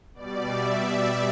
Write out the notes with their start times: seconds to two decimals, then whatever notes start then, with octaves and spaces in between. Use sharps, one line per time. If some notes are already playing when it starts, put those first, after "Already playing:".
0.14 B2 G3 D5
0.52 E5
0.89 E5